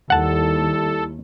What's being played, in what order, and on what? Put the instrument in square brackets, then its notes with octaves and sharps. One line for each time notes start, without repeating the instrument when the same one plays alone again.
[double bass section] D#2 [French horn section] G3 E4 [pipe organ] A4 [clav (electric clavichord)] F#5 A5